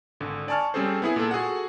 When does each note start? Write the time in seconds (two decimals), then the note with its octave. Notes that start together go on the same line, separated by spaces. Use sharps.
0.20 G#1 D3
0.48 D5 G#5 A5 C#6 F6
0.74 G3 C4 C#4 G#4 A4 C5
1.02 B3 E4 G#4
1.16 A#2 A4
1.31 F#4 G#4 A4 F#5